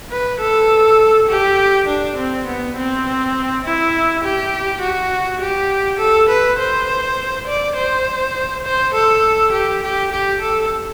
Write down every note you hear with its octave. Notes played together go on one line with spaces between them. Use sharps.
B4
A4
G4
D4
C4
B3
C4
E4
G4
F#4
G4
A4
B4
C5
D5
C5
C5
A4
G4
G4
G4
A4